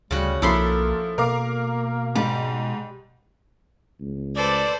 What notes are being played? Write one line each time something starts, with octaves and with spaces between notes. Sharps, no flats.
D2 C#3 G3 F#4
B1 F3 A#3 E4 A4 B5 C6
B2 A#3 A#4 F5 D6
G#2 G3
C#2
A4 B4 C5 D5